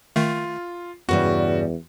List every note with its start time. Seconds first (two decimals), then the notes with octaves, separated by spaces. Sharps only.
0.16 D#3 A3 F4
1.09 E2 G2 C#3 G3 F#4